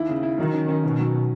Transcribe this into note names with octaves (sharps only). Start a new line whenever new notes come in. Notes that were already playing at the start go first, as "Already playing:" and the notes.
Already playing: D#2 E4
C#3
E4
D#3 F#3
C#4
C#4
B2 D#3
F#3